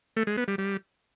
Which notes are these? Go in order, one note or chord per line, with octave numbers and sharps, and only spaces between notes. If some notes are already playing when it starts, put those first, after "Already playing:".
A3
G#3
B3
G3
G3